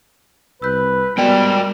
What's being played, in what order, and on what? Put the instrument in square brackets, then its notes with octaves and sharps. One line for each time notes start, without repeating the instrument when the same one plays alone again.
[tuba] C2 [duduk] B4 [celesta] E6 G6
[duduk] G3 [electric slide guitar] G#3 G5 [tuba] B3 [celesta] F#4 A#4 D5